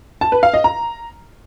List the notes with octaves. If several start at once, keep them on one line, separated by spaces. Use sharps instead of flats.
A5
B4
F5
D#5
A#5